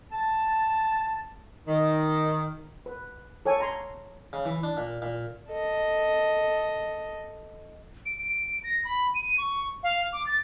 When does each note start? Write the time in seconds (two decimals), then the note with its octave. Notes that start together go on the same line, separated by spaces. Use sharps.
0.12 A5
1.68 D#3
2.86 B4
3.46 A4 C#5 G#5
3.60 A#5 C6
4.33 C#3
4.45 E3
4.63 D4
4.77 A#2
5.02 A#2
5.49 A4 D#5
8.06 D7
8.18 D7
8.64 A#6
8.85 B5
9.14 D#7
9.38 C#6
9.83 F5
10.13 D6
10.26 A6